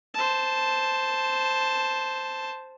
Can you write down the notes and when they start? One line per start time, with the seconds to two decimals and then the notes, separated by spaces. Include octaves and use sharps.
0.14 C5 A5